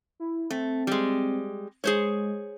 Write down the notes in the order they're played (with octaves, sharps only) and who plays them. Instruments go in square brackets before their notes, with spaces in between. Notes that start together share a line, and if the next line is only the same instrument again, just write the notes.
[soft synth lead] E4
[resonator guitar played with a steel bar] A3 [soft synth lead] C4
[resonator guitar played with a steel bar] G3 G#3
[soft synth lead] G#3 [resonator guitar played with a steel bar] G#4 C5 C#5